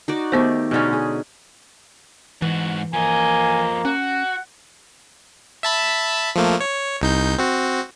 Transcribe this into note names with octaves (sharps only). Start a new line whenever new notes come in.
D#4 F#4 D5
D#3 A3 B3 G4 C5
B2 D3 G#3 C#4 D#4
G#4
G#2 E3 F#4
F3 A#3 D#5 G#5
C#4 F#4 F#5
E5 A5 B5
F3 A3 A#3
C#5
C2 D#4 G6
C4 F#4